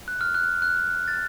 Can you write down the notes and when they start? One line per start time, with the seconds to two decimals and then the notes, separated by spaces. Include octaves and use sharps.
0.08 F#6
0.21 F6
0.35 F#6
0.62 F#6
1.08 A6